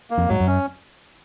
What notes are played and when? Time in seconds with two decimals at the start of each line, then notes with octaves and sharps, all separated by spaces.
0.10 A#3
0.17 F2
0.28 G#2 F#3
0.40 F#2
0.47 C#4